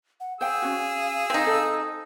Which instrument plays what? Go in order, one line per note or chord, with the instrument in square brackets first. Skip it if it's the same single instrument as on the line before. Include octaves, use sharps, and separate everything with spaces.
[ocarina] F#5
[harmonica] G#4 E6 [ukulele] C5 G5 [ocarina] F5
[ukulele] C#4 F#4
[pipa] C4 D#4
[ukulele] A4